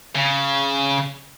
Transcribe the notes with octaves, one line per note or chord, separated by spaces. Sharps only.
C#3